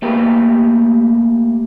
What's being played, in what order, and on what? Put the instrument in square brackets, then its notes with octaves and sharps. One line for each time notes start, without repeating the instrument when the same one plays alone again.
[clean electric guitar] A3 A#3 G4 B4